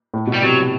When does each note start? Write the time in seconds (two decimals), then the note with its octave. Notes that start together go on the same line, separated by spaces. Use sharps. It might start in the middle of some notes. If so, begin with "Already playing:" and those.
0.14 A2
0.27 B2
0.34 G3
0.42 C3 F#3